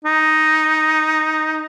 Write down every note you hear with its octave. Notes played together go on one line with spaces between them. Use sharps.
D#4